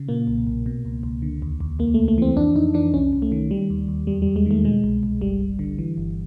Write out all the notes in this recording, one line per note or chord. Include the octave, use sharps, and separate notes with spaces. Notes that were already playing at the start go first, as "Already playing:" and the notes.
Already playing: C#3
A#2 A#3
B1
B1
B2
C#2
C#2
D3
D#2
D#2
C#2 A#3
C#2 A3
A3
E3 C4
F2 D4
F2 D#4
E3 D4
C2 C#4
C2
A3
D#3
D#3 G3
D#2
D#2
E2 G3
E2 G3
G#3
D#3 A3
B2 G#3
C2
C2
G1 G3
G1
D3
E3
G1